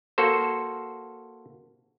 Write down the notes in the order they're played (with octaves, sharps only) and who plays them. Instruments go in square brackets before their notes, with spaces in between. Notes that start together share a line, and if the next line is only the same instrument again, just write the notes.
[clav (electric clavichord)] A#3 F#4 A4 C5